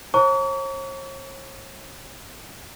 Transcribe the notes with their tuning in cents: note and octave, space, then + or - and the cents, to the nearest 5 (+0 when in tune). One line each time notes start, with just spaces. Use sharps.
C#5 -45 A#5 -35 C#6 +45